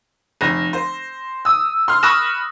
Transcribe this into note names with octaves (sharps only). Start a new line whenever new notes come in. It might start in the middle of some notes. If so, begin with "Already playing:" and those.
F1 A#6
C5
D#6 E6
C6 F6
B5 C#6 D#6 F#6 A#6 E7